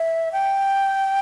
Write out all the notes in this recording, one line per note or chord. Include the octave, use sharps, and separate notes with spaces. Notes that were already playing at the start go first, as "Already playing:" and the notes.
Already playing: E5
G5